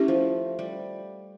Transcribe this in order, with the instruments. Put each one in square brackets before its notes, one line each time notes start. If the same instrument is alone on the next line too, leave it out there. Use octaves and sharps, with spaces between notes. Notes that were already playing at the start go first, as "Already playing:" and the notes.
Already playing: [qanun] A3 [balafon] C#4 E4 G4
[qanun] F3
G3